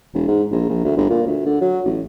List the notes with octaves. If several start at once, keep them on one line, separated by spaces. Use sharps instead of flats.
E1
G#2
A#1
A#1
D2
G1
A#2
D2
D3
F#3
A1